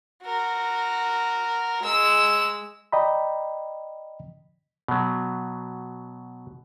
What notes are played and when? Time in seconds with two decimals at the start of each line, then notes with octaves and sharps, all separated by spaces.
0.24 F#4 A#4
1.82 G#3 E6
2.92 D5 D#5 G5 A#5 B5
4.88 B2 F#3